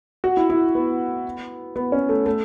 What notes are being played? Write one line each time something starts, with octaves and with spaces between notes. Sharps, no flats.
F#4
E4
E4
B3
B3
C#4
A3
A3